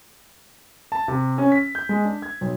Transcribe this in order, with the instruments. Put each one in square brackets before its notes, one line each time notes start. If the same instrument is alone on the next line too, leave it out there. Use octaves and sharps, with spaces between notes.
[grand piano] A5
C3
C#4
B6
G6
G#3
D4
G#6
B1